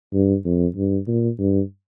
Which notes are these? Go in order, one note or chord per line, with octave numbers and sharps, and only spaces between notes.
G2
F2
G2
A#2
G2